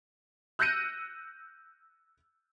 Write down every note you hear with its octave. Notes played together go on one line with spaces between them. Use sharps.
E6 F#6 G6 A#6 C#7 D#7